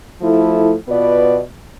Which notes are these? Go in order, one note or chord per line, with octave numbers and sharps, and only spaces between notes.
F3 A3 E4 A4
B2 B3 F4 B4 D5